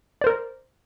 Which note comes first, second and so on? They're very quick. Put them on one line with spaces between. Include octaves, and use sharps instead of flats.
D5 C5 A#4